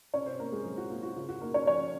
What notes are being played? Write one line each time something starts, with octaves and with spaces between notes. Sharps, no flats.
C3 C#4 C#5
C4 C5
A#3 C#4 A#4
G#3 G#4
F#3 G#4
F#4
A#3 F4
F#4
C#3 F4
F#4
A#3 D#4 A#4
C#4 C#5
F3 C#4 C#5